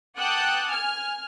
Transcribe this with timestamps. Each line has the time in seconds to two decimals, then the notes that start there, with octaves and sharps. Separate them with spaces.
0.17 F#5 G5 A5 D6 D#6 F#6
0.68 G#5 F6